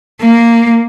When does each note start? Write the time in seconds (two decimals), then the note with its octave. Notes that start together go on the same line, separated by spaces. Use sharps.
0.21 A#3